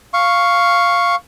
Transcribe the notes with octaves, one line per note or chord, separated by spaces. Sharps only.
F5 C#6